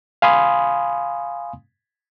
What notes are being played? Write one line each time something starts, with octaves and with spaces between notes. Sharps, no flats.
F5 G#5 B5 C6 D#6